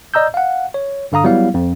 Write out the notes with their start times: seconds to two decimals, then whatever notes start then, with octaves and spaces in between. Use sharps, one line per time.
0.14 D5 D#5 A#5 E6 G6
0.34 F5 F#5
0.74 C#5
1.12 G2 D3 F5 A#5 D#6
1.24 F#3 G3 B3 E4 F5
1.54 F2